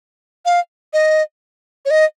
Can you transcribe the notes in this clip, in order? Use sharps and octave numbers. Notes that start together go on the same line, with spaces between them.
F5
D#5
C#5
D#5